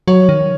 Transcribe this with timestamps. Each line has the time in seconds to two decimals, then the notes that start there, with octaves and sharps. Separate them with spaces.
0.08 F#3 C#5
0.29 D#3